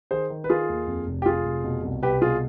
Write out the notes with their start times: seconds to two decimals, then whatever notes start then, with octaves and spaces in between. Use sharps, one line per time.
0.11 D#3 G#4 C5
0.30 D#3
0.44 B4
0.49 D#3 F4 G#4
0.69 D#2
0.87 F2
1.07 F1
1.22 G4
1.26 F1 F4 G#4
1.45 F1
1.64 B2
1.84 C2
2.03 C2 G4 B4
2.22 B2 F4 G#4